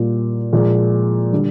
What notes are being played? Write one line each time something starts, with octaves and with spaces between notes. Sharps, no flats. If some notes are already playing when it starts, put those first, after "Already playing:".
Already playing: A#2 G3 A#3 F4
A#2 F3 G#3
D3 G3